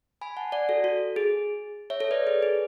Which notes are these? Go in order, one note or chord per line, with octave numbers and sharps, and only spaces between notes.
G#5 B5
F#5 A5
D5 F#5
F#4 A4
F#4
G#4
C#5 E5
A4 C#5
B4 D5
G#4 B4
G#4